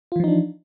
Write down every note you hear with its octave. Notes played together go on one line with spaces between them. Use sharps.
E3 F3 D4 D#4 F4